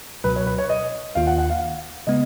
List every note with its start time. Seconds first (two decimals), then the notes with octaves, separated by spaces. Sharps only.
0.24 C#2 B2 F#3 B4
0.36 C#5
0.46 B4
0.58 C#5
0.69 D#5
1.15 D#2 D#3 A#3 F4 F5
1.27 F#5
1.38 F#5
1.50 F5
2.07 C#3 G#3 B3 D#5